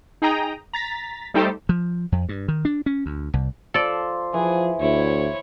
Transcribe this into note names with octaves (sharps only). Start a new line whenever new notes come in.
D#4 G#4 G5 A#5 D#6
A#5 A6 B6
G3 A3 D#4 G4 A4 C5
F3
F2
G2
D#3
D4
C#4
D2
C2
F3 A4 D5 C6
E3 F3 G#4
D2 E4 C#5